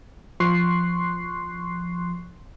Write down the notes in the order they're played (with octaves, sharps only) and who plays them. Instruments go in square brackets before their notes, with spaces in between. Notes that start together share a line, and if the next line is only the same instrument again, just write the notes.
[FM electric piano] F3 C6 C#6 F#6 C7